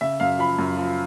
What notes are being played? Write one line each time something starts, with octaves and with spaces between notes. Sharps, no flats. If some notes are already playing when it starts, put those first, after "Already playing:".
C#3 E5
F#2 F5
F3 B5
F#2
F3